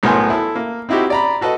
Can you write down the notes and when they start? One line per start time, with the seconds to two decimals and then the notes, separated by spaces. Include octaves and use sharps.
0.03 B1 A2 B3 A#4 G#5 C6
0.30 E4 A4
0.56 A#3
0.89 C4 D#4 E4 F#4 G4
1.10 D5 A#5 B5
1.41 F#4 A4 B4 D#5